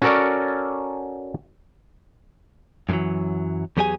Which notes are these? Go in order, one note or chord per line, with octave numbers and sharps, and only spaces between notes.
C#4 F#4 A4 A#4 C#5 D5
F#2 A2 D3 E3 F#3
E2 F#3 G4 G#4 D5 G#5